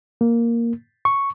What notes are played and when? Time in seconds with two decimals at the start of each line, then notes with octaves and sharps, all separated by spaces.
0.21 A#3
1.05 C#6